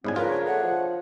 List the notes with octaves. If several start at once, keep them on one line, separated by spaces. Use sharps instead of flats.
G#2 C#3 G3 B3 E4 G#5
C#3 F3 F4 A#4 B4
D4 G#4 C#5
A3 F#5
F3